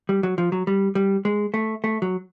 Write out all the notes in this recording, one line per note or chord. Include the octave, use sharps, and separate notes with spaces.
G3
F#3
F3
F#3
G3
G3
G#3
A3
A3
F#3